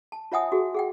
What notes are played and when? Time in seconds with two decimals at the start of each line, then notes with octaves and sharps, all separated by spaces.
0.12 A5
0.32 F4 C#5 E5 F#5 G#5 D#6
0.52 F#4 G#4
0.75 G#4 F#5 G5